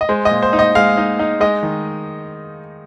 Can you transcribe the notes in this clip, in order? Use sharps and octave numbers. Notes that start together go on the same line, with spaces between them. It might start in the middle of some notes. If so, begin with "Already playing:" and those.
D#5
G#3 C5
D#5
A#2
C5
D#4
D#5
G#3 F5
D#4
D#4
G#3 D#5
D#3